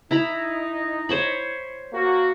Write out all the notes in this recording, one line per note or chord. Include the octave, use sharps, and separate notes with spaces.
D#4 E4 A#5 B5
C5 C#5 B5
A#3 F#4